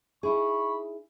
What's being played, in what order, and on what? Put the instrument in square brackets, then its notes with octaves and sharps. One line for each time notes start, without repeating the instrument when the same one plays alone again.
[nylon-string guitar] D#4 E4 G#4 [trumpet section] B5 C#6